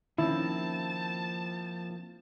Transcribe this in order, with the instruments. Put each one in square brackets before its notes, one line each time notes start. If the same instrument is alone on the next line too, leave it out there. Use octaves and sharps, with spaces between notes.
[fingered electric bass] D#3 C#4 [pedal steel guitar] F3 A#3 C4 [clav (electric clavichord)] E4 [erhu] A5